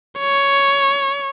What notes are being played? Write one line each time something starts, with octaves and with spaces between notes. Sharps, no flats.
C#5